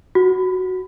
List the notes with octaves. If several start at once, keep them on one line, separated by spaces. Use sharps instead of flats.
F#4